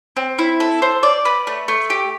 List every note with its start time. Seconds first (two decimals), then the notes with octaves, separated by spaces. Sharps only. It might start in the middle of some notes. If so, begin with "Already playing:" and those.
0.17 C4
0.39 E4
0.60 A4
0.82 C5
1.03 D5
1.25 B4
1.47 A3
1.68 A3
1.90 G4